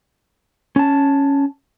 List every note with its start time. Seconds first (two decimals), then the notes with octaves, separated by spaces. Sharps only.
0.76 C#4 A5